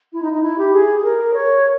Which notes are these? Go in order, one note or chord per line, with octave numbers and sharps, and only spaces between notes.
E4
D#4
D#4
E4
G4
G#4
G#4
A#4
C#5